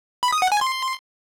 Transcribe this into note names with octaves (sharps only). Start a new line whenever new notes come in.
B5
D#6
F#5
G#5
C6